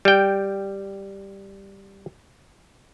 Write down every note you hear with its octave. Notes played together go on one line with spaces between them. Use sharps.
G3 G5